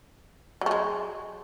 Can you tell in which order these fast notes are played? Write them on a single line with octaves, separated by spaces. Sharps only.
F#3 A3 G#3